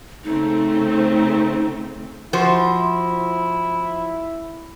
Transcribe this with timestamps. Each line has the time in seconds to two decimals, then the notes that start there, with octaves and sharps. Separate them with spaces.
0.24 C#3 A3 C4 D#4
2.33 F3 E4 F#4 C5